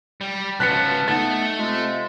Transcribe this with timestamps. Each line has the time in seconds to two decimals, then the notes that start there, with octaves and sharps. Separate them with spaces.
0.21 G3
0.60 C#2 F3 F#3 B4 A5 F#6 B6 C#7
1.08 A3 B3 D#4 A6
1.59 C3 G#3 C4 F4